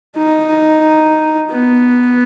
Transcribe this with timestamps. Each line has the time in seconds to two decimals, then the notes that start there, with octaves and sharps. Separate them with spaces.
0.17 D#4
1.50 B3